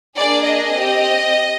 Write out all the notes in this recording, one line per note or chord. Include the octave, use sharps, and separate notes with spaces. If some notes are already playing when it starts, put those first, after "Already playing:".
A#3 D4 G#4 D5
D#5
C4 G4